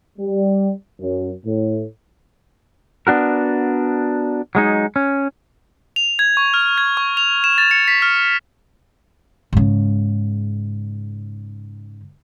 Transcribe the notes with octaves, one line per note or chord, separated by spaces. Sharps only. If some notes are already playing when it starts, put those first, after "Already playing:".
G3
F#2
A2
B3 D4 F#4 A#4
F#3 G#3 D#4
C#4
F7
G#6
C#6
F6
G#6
C#6
F7
E7
A6
C#7
B6
F6
G#2 C#3